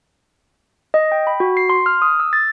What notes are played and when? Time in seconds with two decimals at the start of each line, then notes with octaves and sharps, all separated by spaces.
0.94 D#5
1.12 G5
1.27 B5
1.40 F#4
1.57 C7
1.70 C6
1.86 F6
2.02 D#6
2.20 E6
2.33 A6